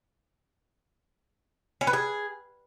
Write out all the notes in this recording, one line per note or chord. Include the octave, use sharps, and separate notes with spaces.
C#4
B4
G#4